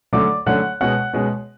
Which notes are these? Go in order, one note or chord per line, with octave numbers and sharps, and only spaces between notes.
D3 F#3 A3 C#4 D5 D6
D3 F#3 A3 C#4 F#5 F#6
B2 G#3 C#4 F#5 F#6
B2 G#3 C#4